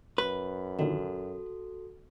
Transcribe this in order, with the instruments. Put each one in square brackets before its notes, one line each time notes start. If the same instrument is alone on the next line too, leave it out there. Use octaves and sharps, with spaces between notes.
[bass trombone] F#2 [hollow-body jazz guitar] B4
[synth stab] A#2 D3 D#3 [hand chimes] F#4 A4